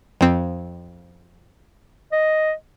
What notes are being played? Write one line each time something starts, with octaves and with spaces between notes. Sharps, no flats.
F2 C4
D#5